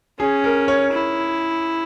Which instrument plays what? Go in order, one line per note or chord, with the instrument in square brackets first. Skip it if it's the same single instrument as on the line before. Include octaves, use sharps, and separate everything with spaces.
[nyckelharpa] C#4 [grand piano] G#4
[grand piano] A#4
C#5
[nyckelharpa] E4